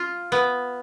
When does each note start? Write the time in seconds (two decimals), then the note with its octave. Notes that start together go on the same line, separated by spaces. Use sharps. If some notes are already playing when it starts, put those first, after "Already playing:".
Already playing: F4
0.32 B3